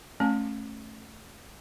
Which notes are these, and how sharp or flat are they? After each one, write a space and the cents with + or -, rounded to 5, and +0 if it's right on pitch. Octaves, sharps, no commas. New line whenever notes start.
A3 -10 C#4 -25 G#5 +40